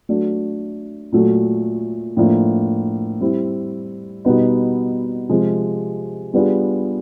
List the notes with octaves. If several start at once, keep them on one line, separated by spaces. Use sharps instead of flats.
F#3 A3 D4
A#2 F#3 A3
A2 F3 A#3 D4
G3 C4 E4
B2 G3 B3 D#4
C3 F3 G#3
G3 B3 D4 F4 G#4